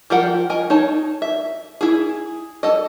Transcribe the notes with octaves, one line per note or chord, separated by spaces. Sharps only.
F3 F4 G4 A#4 F#5
A#4 D#5 G#5
D#4 C#5 A5
E5
E4 G#4
A4 D#5